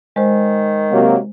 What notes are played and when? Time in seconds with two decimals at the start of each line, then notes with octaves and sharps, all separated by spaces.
0.16 D#3 G#3 C5
0.91 C3 F#3 A#3